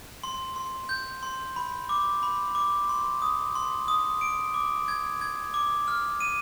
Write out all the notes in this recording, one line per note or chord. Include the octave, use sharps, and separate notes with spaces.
C6
C6
G6
C6
B5
D6
B5
D6
C6
D#6
C6
D#6
D7
D6
G#6
G#6
D6
F6
D#7